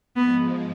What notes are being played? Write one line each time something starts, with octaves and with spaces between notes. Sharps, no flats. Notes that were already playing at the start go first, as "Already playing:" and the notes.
G#2 F3 G#3 B3